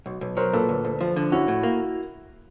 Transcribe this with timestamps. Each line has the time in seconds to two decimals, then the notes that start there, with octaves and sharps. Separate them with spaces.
0.06 B1
0.21 B1
0.37 F#3 A#4 C5
0.53 A#2 A4 B4
0.69 D2
0.85 D2
1.01 F3
1.16 D3
1.32 C#4 E4 F#4
1.48 A2
1.63 A#3